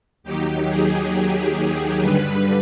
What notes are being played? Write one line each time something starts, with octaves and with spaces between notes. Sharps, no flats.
D#2 D#3 F#3 G4
G#4
G2 D3 G3 B4